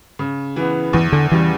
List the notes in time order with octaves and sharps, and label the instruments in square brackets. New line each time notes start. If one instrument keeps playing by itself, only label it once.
[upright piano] C#3
E3 B3
[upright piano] E2 [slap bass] E3
[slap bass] D3
[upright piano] C#3 G3 [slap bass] E3